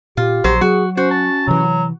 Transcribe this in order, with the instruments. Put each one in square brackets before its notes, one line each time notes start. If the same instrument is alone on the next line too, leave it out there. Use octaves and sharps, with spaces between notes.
[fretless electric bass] A#2 [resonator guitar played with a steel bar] F4 [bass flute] G4
[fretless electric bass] A#1 [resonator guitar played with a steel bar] F#3 C5
[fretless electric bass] F#3 [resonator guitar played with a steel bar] F#4 [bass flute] G#4
[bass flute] C#4 [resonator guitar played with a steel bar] F#4 [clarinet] C5
[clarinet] A5
[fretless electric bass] C3 E3 [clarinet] F#3